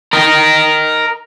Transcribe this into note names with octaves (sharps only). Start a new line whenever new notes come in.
A#4 D#5